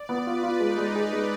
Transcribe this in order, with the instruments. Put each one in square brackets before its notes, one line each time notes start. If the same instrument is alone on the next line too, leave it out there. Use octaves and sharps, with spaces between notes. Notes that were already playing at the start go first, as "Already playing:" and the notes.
Already playing: [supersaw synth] D5
[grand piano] B3
[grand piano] F4 [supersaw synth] B4
[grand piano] F4
[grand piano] G#3 [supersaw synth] D#4
[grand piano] G#3
G#4
G#3